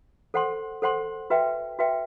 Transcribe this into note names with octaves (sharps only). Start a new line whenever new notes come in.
A4 C5 F#5 C6
A4 C5 F#5 C6
F#4 B4 E5 G5
F#4 B4 E5 G5